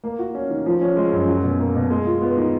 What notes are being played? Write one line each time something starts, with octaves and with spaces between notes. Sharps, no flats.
A#3
F#4
C#4
D#3
F3
C#4
G#3
F#2
F#3
B2
A#3
B2
G#3
F4
B3
D#3